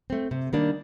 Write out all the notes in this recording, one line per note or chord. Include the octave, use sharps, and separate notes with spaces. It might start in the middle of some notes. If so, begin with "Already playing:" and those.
A3 C4
C3
D#3 G3 A#3 D4